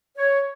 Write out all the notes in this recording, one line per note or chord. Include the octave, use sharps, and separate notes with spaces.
C#5